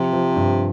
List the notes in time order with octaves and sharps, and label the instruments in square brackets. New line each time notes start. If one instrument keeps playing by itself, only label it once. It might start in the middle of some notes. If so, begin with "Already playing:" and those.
Already playing: [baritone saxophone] C3 [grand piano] F3
[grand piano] F3
G2